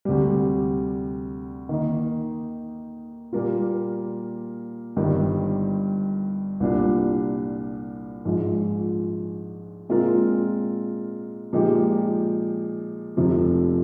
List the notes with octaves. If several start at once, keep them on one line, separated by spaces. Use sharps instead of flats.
D2 C3 G3
D#3 A#3 D#4
A#2 G3 A#3 F4
G1 G2 D#3 G3
C2 A#2 G3 D4
A#1 G#2 F3 G#3
A#2 G#3 C4 F4 A#4
A#2 F3 G#3 D#4 G4
F1 F2 C3 F3